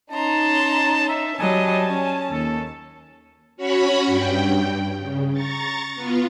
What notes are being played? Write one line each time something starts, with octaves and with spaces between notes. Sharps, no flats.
C#4 D#4 A5 A#5 C6
E5
F#3 G3 D#5 G#5 A5
C#4
D#2 A4
C#4 F#4 C#5 F#5 B5
G2 G5
C#3
A#5 C#6 A6
B3 F4